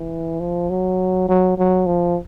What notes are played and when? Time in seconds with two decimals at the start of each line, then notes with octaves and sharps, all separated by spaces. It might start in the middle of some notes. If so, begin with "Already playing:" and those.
Already playing: E3
0.40 F3
0.70 F#3
1.29 F#3
1.58 F#3
1.86 F3